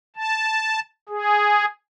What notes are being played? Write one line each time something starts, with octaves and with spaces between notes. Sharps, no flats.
A5
G#4